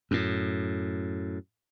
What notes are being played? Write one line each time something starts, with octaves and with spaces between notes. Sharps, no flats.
F#2 A2